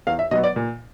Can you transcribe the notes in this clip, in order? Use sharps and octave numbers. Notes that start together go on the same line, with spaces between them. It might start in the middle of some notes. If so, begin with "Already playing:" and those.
E2 F5
E5
B2 F#3 B3 D#5
D5
A#2